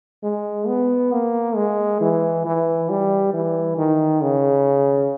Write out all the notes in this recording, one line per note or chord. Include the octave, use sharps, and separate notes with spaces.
G#3
B3
A#3
G#3
E3
E3
G3
E3
D#3
C#3